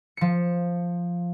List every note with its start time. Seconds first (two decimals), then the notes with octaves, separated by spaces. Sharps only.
0.17 F3 C#7